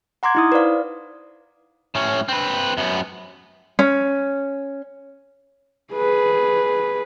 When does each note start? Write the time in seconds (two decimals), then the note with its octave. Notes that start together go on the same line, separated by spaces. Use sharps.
0.23 F#5 A#5 C6 D6 G#6
0.35 D#4 E4 D#6
0.52 B4 C5 D5 F5
1.95 A2 C#4
2.29 C4 B4
2.77 F#2 B3
3.79 C#4
5.93 G#4 B4